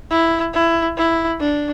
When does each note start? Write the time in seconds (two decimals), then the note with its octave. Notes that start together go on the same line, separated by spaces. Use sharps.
0.10 E4
0.53 E4
0.97 E4
1.40 D4